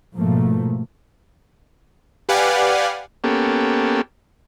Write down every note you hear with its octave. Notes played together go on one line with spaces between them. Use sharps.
G#2 B2 F3 A3 A#3
G4 B4 D5 F5 F#5 G#5
A#3 B3 C#4 G4 A4